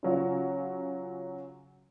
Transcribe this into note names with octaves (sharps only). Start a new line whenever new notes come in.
C#3 F#3 F4